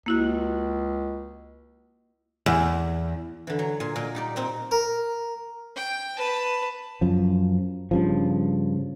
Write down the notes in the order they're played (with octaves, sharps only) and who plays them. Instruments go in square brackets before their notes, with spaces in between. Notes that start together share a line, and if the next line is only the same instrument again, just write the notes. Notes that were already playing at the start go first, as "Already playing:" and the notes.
[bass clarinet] C#2 [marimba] A#3 E4 F#4
[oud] E2
[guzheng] D3 E3
F#3
A#2 G#5 C6
A#2 D#5
G3 D#4 D5
A#2 C4 D#4
[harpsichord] A#4
[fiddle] G5
B4 A5
[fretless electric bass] F#2 F3
G2 C#3 F3